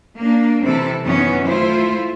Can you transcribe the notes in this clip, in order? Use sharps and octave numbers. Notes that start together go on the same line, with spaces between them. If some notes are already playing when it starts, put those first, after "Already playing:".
A#3 D4
C3 E3 C4 E4 A4
F#2 D#3 E3 F#3 B3 C#4
A3 E4 F4 C5